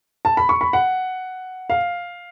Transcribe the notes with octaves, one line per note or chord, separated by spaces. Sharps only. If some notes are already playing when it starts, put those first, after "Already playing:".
A5
B5
C#6
B5
F#5
F5